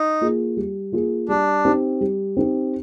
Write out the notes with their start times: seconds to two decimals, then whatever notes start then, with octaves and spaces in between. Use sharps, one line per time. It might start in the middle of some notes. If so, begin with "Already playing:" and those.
Already playing: D#4
0.21 A#3 F4 G#4
0.57 G3
0.92 A#3 F4 G#4
1.28 G3 D4
1.65 C4 D#4 G4
2.01 G3
2.37 C4 D#4 G4